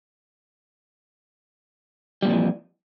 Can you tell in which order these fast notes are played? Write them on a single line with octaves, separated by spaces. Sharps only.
G3 A#2 F2 F#3 E3